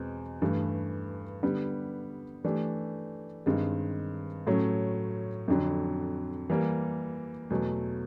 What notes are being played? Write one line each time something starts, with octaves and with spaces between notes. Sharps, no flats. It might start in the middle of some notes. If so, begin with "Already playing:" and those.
Already playing: E2 B2 G#3 C4
G2 E3 A3
D3 G3 B3
E3 A3 D4 G4
G2 D#3 G#3 C4
A2 F#3 A3 C#4
F2 D3 F#3
E3 G3 A#3
E2 B2 F#3 A3